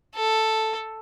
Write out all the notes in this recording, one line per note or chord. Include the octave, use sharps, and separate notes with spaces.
A4